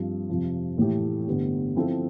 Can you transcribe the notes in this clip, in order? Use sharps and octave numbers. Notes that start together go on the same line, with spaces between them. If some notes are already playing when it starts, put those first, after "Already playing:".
Already playing: G2 F3 C4
F2 C3 F3
A2 E3 A3 E4 G4
G2 D3 G3 B3
F3 C4 E4 A4